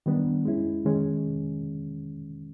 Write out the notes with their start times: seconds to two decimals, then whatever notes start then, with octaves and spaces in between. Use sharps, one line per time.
0.06 D#3 G3 B3 D4
0.45 G#3 C#4 E4
0.86 D#3 G#3 C#4